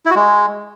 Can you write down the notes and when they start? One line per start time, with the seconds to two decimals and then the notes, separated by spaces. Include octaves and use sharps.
0.06 E4
0.11 F#4
0.16 G#3